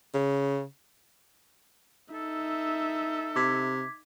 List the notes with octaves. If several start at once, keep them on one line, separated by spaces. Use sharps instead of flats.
C#3
D#4 A4 E5
C3 D6 G#6 B6